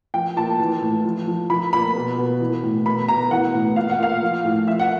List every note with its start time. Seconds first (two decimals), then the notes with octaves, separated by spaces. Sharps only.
0.14 F3 G5
0.36 A#2 A5
0.60 E3
0.82 A2
1.05 F3
1.27 F3
1.50 F3 B5
1.73 A#2 B5
1.95 B2
2.18 B2
2.40 E3
2.63 A2
2.86 B2 B5
3.08 B2 A#5
3.31 E3 F#5
3.54 A2
3.76 A#2 F5
3.90 F#5
4.00 A#2 F5
4.22 F3
4.45 A2
4.67 F3 E5
4.79 F#5